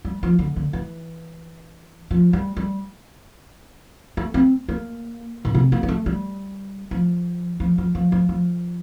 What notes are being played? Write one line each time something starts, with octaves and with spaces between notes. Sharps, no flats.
G3
F3
D3
D3
E3
F3
G3
G3
A3
C4
A#3
A#2
C3
A#3
A#3
A3
G3
F3
F3
F3
F3
F3
F3